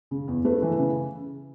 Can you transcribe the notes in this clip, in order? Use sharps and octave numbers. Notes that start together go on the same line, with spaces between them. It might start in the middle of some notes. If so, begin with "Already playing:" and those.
C#3
E2
A3 B4
E3
C#3